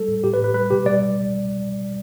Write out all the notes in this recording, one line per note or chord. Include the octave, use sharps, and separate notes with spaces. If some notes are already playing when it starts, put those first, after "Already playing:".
Already playing: G3 A4
A2
A2 G4
B4
A2
B4
G3 B4
B2 G4
G3 D5